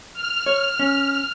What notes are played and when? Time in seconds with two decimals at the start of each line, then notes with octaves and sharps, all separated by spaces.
0.13 F6
0.46 C#5
0.79 C#4